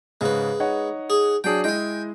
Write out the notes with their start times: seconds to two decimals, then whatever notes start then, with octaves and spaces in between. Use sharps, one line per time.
0.21 G#2 C#3 G#3 B4
0.60 D#4 C#5 F#5
1.10 G#4
1.44 F#3 D4 G#4 G5
1.64 G#3 E4 D#5 G5 G#5